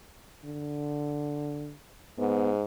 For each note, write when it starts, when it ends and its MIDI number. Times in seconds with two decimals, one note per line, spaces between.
0.44 1.73 50
2.18 2.64 44
2.18 2.51 59